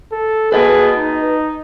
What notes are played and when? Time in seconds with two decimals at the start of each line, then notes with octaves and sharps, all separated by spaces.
0.12 A4
0.52 G#4 B4 D#5 A5
0.96 D#4